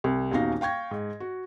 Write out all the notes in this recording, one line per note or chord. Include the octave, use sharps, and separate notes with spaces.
C2
D#1 E2 D#4 F#4 F5 A#6
F5 G5 C#6 G#6 A#6
G#2
F#4